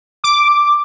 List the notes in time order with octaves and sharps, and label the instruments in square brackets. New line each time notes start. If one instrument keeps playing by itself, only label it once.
[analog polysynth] D6